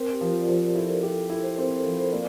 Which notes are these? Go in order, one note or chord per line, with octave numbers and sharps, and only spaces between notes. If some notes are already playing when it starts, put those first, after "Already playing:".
Already playing: C4 A#4
G4
F3
F4
D5
F3 C5
E4 A4
A#4
G4 A4
E4
C5
C4 A#4
A4
F3 A4
C5
A#3 D5